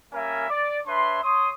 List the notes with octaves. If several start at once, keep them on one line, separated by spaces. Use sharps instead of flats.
G3 A#3 C#4 A#4 E5 G#5
D5
D4 B4 C#5 E5 C6
C#5 C6 D#6